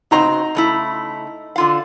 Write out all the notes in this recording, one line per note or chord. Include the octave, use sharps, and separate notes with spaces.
C#3 C4 D#4 F#4 A#5 C6
C#3 A3 E4
D3 F4 F5